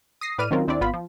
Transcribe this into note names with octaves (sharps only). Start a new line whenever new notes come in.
D#6 A#6 C7
A2 B4 D5 F6 D#7
D#3 F#3 C4 C#4 F4 A#4
D#2 C4 D4 E4 D5
G#1 B3 F4 B5
F3